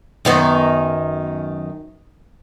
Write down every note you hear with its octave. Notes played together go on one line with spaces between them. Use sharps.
F#2 D#3 B3